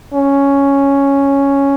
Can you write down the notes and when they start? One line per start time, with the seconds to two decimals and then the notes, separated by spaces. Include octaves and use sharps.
0.14 C#4